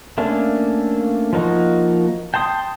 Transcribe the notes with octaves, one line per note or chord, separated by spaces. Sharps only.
A3 A#3 C#4 D4
F3 A#3 D#4 F#4
G5 A5 C6 D#6